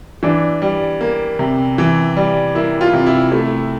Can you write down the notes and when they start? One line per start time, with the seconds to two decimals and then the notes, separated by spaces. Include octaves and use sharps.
0.23 E3 D4
0.62 G3
1.01 A#3
1.39 C3
1.78 E3
2.17 G3
2.55 A#3 E4
2.81 F4
2.93 C3
3.06 E4
3.32 A3